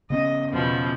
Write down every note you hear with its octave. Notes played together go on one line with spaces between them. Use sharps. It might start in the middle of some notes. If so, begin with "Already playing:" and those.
C#3 B3 C#4 D#5
E2 B2 F3